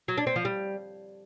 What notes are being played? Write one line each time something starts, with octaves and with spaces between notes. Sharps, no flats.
F#3
D4
C4
F3
G3